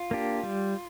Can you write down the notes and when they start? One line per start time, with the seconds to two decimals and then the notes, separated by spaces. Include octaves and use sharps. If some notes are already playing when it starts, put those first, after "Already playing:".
Already playing: F4
0.11 A#3 D4 G4
0.43 G3